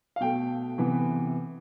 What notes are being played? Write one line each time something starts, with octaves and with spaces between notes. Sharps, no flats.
F5
B2 A3 G5
C3 E3 B3